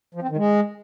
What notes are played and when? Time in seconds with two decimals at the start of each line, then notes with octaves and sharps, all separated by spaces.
0.15 F3
0.22 C4
0.30 D#3
0.37 G#3